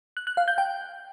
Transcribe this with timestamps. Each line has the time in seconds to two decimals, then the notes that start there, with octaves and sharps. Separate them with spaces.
0.17 F#6
0.27 F#6
0.37 F5
0.48 G6
0.58 G5